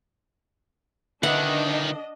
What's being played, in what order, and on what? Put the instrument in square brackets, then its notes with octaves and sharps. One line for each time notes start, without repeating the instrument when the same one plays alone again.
[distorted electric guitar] C#2 D#3 [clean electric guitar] D3 B4 E5 [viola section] D4 D#5 [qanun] F#5